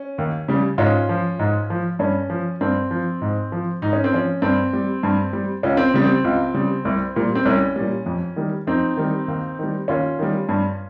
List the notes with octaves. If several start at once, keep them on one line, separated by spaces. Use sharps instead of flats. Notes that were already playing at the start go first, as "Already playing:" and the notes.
Already playing: C#4
D#2
C#3 G3
G#2 C#4 F4
F3
G#2
F3
G2 C#4
F3
G2 C4
F3
G#2
F3
G#2 D#4
C#4
C4
F3 C#4
G2 C4
G3
G2
G3
C#2 C#4
C4
C#3 G3
C4
C#2
C#3 G3
C2
A#2 G3
C4
C2 C#4
A#2 G3
F2
D#3 G3
F2 C4 D#4
D#3 G3
D#2
D#3 G3
D#2 C#4 F4
D#3 G3
G2